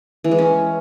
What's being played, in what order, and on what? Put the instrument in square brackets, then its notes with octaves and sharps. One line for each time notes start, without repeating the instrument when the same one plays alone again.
[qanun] E3
G#3
C#4